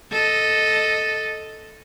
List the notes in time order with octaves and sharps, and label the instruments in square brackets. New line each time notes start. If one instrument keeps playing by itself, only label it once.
[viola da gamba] A4 D#5